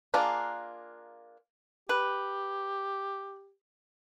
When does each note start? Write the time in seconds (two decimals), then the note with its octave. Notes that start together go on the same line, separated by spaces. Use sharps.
0.14 A#3 D4 F4 G#4 A#4
1.89 G4 B4